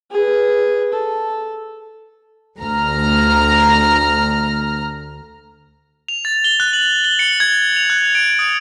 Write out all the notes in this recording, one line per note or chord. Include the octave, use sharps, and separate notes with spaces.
G#4 B4
A4
D2 A#5 F6
F7
A6
G7
F#6
F#7
G7
C#7
G#6
F7
F#6
D7
D#6